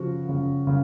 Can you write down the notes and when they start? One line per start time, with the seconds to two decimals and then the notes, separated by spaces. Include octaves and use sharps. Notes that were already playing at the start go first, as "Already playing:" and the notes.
Already playing: C#3 F3 F#4
0.29 C#3
0.67 C#3